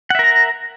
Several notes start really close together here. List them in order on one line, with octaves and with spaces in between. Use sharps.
F#5 E5 A#4 A#5